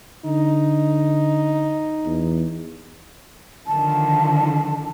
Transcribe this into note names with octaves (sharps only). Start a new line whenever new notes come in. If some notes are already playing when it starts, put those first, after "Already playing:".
D3 D#4
E2
D3 D#3 F3 A5